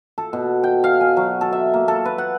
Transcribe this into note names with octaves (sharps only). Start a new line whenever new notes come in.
A4
B2
G5
F5
G#5
F#3
A4
E5
A#3
A4
B4
F#5